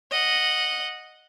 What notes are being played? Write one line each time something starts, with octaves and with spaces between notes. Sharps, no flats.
D#5 F#5